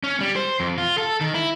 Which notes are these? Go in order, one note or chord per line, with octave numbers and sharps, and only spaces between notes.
C#4
G3
C5
F2
F4
A4
D#3
E4